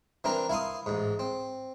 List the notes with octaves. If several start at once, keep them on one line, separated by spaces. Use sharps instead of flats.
E3 C4 D4 A#4
E4 F5 C6 D#6
A1 G#2
C4